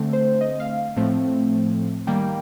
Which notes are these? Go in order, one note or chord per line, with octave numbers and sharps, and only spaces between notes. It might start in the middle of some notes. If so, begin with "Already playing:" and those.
Already playing: D3 A3 C4
C5
D#5
F5
A2 F3 A3 C4
D#3 G3 A#3 G5